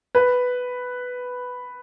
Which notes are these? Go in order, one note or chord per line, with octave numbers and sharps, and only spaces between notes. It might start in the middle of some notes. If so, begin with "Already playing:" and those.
B4